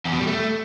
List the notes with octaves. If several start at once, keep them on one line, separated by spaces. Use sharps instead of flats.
E2
B2
G3
A3